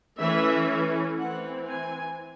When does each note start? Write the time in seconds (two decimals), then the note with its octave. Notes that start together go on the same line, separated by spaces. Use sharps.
0.19 E3 A3 C#4 E5
1.18 E3 C4 F#5
1.68 G#5